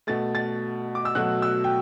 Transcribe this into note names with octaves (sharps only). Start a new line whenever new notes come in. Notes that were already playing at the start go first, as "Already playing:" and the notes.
B2 A3 A6
A6
D6
E6
B2 F#3 A3 F#6
E6
G5